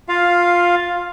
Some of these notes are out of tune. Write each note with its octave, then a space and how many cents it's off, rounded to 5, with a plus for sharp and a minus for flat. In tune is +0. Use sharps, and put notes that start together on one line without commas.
F4 +10 F5 +0